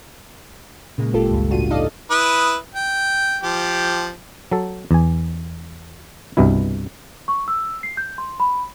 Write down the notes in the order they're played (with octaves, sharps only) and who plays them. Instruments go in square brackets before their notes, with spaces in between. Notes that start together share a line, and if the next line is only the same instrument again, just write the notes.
[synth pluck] A#2 C#3 G#3 A#3
G1 F4 G4 A4
C#2 G2 C#3
A2 D4 F4 F#4 D#7
D#4 A4 D5 D#5 F5
[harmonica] E4 B4 D#6
G5
F3 G4
[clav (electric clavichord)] F#3 A4
E2 G#5
C2 G2 B2 E4
[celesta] C#6
E6
C7
G6
C6
B5